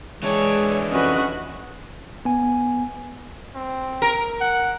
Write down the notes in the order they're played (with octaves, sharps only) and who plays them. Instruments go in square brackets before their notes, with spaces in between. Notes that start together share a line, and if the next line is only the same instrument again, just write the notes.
[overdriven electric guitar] E3 D4 [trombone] G#3 [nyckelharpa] G#4 C#5
[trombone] F2 [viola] C#4 F#4 [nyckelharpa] B4 D#5
[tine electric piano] B3 G#5
[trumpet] C4
[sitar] A#4
[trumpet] F#5